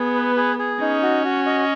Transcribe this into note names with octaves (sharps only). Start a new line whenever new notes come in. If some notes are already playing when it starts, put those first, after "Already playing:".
Already playing: B3 G#4
B4
G#4
G#4
C#4 D#4
F#4
F#4
D#5